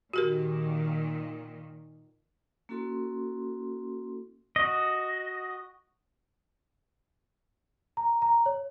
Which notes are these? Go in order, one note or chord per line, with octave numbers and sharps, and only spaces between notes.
A#2 D#3 F#4 G4 A#4
A#3 C#4 E4 F#4 A4 C6
F#4 D#5
A#5
A#5
C#5